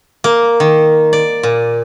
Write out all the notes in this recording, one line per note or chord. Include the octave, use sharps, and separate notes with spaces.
A#3
D#3
D5
A#2